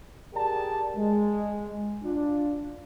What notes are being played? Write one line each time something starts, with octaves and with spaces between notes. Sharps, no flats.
G4 G#4 A#4 D5 G5 A5
G#3
D4 F4